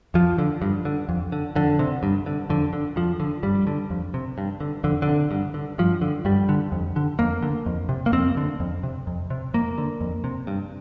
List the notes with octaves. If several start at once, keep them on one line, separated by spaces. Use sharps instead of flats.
F2 F3
D3
G2
D3
F2
D3
F2 D3
C3
G2
D3
F2 D3
D3
F2 F3
D3
G2 G3
D3
F2
C3
G2
D3
F2 D3
D3
C3
G2
D3
G2 F3
D3
G2 G3
D3
F2
D3
F2 A#3
D3
F2
C3
A#3
F2 C4
D3
F2
C3
F2
C3
F2 A#3
D3
F2
C3
G2